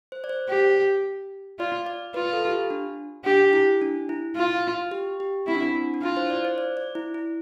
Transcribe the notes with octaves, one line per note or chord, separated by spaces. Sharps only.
C5
D5
C5
G4
F4 D5
D5
F4 B4
A4
G4
F4
D4
D4 G4
E4
D4
E4
F4
G4
G4
C4 E4
D4
C4
D4
D4
E4 F4
C5
D5
C5
D5
D5
E4
E4